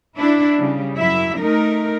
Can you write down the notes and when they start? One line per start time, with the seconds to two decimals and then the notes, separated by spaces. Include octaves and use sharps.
0.17 D4 E4
0.59 C#3 G3
0.97 F#2 E4 E5
1.38 A3 D#4 A#4